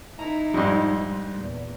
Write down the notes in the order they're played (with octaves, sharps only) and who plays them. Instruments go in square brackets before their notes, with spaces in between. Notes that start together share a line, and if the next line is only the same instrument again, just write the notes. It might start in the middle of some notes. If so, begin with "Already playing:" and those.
[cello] D#4 E4 [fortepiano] A#5
[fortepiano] F2 G#2 [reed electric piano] G3 D4 C6
[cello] E2 A#2